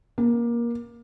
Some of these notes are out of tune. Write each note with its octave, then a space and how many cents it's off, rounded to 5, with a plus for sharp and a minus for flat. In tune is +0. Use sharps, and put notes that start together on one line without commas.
A#3 +20